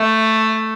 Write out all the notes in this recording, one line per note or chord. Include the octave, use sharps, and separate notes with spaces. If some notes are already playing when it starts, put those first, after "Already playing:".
Already playing: A3